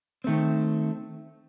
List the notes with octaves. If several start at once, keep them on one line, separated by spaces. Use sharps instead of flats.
D#3 A3 C4